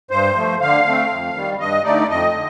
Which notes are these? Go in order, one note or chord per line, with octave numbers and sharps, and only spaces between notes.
G2 C5
F3 A3
D3 F5
A3 C4
F2
D#3 G3
G2 D#5
D3 A3 D#4 D5
F2 D#5
D3